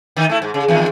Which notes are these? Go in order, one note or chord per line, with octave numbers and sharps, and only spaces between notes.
D#3 D#4
A3 E4
G#2
C#3
E2 G#2 D#3